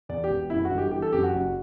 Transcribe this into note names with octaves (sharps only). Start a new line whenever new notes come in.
E2 D5
G4
E1
F#2 E4
F#4
G1
G4
E3 G4
A4
F#2 G4
F#4
F#1 F#4